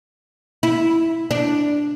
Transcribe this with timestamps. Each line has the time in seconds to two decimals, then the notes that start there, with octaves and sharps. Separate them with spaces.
0.63 E4
1.31 D4